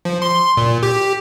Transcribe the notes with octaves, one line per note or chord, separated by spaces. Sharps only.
F3
C6
A#2
G4